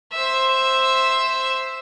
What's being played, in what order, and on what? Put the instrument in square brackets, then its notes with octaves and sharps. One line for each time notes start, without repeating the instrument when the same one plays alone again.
[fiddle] C5 E5